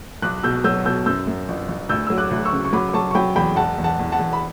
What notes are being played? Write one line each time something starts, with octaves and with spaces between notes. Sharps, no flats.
B1 D6 F#6
B2 E6 G6
F#3 E6 G6
B2 E6 G6
F#2 E6 G6
F#2
G1
G1
D2 E6 G6
F#3 E6
D6 F#6
D2
C#6 E6
C#3
C#6
F#3 B5 D6
D6
F#3 A5 C#6
C#6
F#3 G5 B5
E2 G5 B5
E1 F#5 A5
E2
F#5 A5
E2
F#5 A5
E2
B5